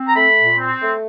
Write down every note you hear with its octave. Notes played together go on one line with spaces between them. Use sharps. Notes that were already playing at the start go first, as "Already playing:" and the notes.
Already playing: C4
A#5
A3 B5
A#2
C4
A3